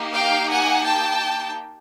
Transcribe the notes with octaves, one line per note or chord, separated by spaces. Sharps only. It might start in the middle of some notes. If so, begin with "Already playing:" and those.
Already playing: A#3 D#4 G4
F5 G5
F#5 G#5
G5 A5